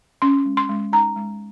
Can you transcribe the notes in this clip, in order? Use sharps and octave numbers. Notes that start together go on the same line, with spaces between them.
C#4 C6
G#3
C6
G#3
D#4 A#5
G#3